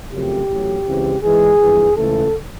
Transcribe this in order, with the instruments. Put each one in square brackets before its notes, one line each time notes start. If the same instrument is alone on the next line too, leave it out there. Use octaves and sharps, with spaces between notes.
[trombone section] F#2 C#3 F3 A3 C4 G4
A1 A2 F#3
C#2 C#3 E3 G#3 C4
G#2 E3 G#3 G#4
G#1 G2 E3
C#2 C#3 E3 A3 A4